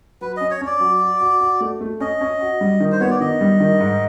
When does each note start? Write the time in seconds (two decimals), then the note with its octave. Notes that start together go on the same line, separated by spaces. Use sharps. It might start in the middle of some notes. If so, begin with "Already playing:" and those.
0.21 F#3 B4
0.37 C#4 D#5
0.51 C#5
0.61 C#4
0.66 D5
0.80 F#3
1.01 F#4
1.21 F#4
1.41 F#4
1.60 A3
1.81 A3
2.00 C#4 D#5
2.21 C#4
2.41 F#4
2.61 G3
2.80 D#3
2.92 C5
3.01 B3 C#5
3.10 D5
3.21 D#3 D#5
3.41 G3
3.60 D#3
3.80 G#2